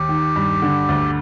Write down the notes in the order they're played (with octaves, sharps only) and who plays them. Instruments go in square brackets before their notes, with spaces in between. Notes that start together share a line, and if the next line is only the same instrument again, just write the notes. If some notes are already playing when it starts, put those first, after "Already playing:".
Already playing: [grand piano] D#2 [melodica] G4
[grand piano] D#3
G2
D3
D2